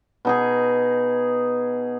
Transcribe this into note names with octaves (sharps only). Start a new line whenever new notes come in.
B2 D#4 G#4